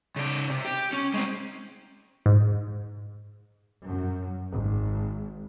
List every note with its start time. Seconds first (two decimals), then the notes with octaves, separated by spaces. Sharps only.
0.16 C#3 D5
0.49 C3
0.65 G4
0.93 C#4
1.14 G#3 C4
2.26 G#2
3.86 F#2
4.51 G#1